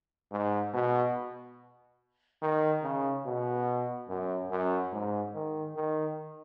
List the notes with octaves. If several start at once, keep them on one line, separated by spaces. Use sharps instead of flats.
G#2
B2
D#3
C#3
B2
F#2
F#2
G#2
D#3
D#3